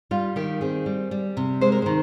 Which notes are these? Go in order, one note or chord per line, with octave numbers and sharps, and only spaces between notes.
G3 F4
D#3 G4
C4 G#4
G3
G3
C3
G#3 C5
A#4
D#3 C5